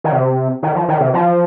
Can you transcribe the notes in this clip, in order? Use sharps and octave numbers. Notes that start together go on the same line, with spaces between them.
D#3
C3
D#3
F3
D#3
C3
F3